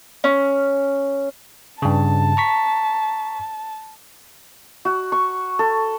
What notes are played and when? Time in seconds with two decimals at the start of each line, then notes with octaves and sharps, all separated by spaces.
0.24 C#4
1.82 G2 C#3 A5
2.37 A#5 C#6 B6
4.85 F#4
5.12 C#6
5.59 A4